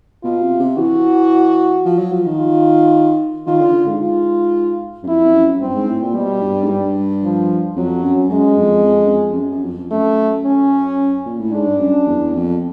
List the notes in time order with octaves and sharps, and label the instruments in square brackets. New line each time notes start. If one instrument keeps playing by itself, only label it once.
[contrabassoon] B2 [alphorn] F4
[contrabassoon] C3
C3
[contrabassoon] E3 [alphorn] F#4
[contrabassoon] F3
F#3
F3
D#3
[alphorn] F4
[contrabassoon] D#3 [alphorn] F4
[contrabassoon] D3
D3
G#2
[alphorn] F4
[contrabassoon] F#2
[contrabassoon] F2 [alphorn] E4
[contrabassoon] F2
F#2
[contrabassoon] G2 [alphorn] C4
[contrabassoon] G#2
A2
A#2
[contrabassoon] B2 [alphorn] G3
[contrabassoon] G2
G#2
G2
[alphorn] F3
[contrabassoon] F2 [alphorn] F#3
[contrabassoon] F#2
[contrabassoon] F#2 [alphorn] G#3
[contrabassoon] F2
F2
F#2
F2
F2
F#2
F#2
F2
F2
[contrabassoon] F#2 [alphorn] A3
[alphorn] C#4
[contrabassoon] A#2
A2
[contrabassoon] G#2 [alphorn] D4
[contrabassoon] G2
F#2
E2
F2